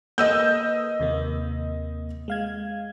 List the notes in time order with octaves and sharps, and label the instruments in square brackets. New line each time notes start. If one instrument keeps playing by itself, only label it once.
[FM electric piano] A#3 A4 B4 [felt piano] D#5 E6 G6
[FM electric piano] D#2 C3 A#3
G#3 F5 G#6